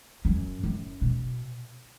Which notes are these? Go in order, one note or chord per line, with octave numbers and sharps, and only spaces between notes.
F#2
F#2
B2